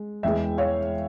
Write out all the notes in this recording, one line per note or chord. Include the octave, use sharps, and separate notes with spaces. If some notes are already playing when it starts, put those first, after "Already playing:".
Already playing: G#3
E1 E2 E3 G#3 E5 G5
C#5 F5